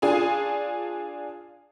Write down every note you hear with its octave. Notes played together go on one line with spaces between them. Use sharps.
D4 F4 G#4